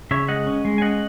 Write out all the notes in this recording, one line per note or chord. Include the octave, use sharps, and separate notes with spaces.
C#3 C#5 E5
G#3 D#5 F#5
C#4
G#3
G#5
C#4 D#5 F#5